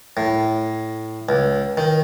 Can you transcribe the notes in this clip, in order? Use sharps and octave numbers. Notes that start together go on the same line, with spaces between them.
A2
C#2
D#3